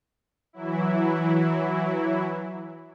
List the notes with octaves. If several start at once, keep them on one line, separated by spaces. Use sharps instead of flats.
E3 F#3 E4